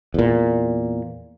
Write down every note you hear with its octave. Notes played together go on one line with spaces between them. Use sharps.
E2 A#2